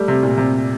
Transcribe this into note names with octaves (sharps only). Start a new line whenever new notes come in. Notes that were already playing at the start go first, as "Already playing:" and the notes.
Already playing: G3 A3
C3
A#2
C3